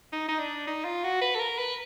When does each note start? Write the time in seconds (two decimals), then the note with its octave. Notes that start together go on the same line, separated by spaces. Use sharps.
0.13 D#4
0.28 D#4
0.39 D4
0.67 D#4
0.85 F4
1.04 F#4
1.21 B4
1.35 A4
1.40 A#4
1.58 B4